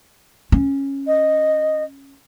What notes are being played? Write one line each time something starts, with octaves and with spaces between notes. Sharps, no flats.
C#4
D#5